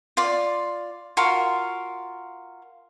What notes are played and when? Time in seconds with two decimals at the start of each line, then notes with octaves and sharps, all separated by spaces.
0.17 F4 D5
1.17 F4 F#4 A#4